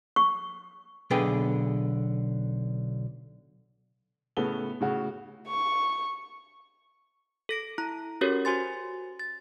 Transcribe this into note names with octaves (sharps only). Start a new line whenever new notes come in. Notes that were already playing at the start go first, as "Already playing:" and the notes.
C#6
B1 D3 B3 G#4 B4 G5
A2 C#3 B3 A4 G7
A2 C#3 F#4
C#6
A4 A#6 D7
E4 A#5
C#4 F#4 G4 A4 A#4 C#5
F#4 C5 G#5 C6 A6
A6